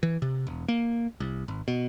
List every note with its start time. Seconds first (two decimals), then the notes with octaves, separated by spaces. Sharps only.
0.03 E3
0.22 C3
0.47 E1
0.68 A#3
1.20 C2
1.48 G#1
1.68 B2